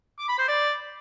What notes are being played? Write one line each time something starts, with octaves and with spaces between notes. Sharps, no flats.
D6
B5
C5
D5